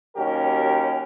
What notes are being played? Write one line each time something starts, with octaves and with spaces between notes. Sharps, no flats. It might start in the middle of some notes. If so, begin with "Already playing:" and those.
D#2 F#3 C#4 G4 A#4